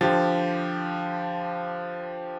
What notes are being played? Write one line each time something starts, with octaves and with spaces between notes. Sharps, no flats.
D3 F3 G4 A6